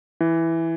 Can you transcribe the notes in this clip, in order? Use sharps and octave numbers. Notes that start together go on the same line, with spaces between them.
E3